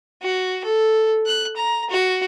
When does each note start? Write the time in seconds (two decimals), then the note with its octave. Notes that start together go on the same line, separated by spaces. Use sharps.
0.22 F#4
0.64 A4
1.26 F#6
1.57 A#5
1.90 F#4